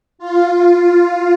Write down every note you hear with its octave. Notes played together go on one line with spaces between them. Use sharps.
F4